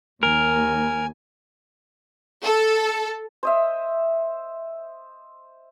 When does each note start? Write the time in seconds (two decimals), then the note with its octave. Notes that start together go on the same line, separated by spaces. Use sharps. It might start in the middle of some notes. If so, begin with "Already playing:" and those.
0.23 D#2 A#4 G#5
2.44 A4
3.43 C5 D#5 E5